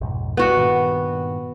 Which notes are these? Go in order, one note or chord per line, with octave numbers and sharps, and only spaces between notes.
B1 F2 G#2
G3 B3 F#4
G2 A#2 D#3